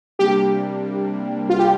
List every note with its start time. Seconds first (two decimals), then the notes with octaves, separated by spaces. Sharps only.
0.19 C3 G3 A#3 D4 G4
1.50 F4
1.59 G4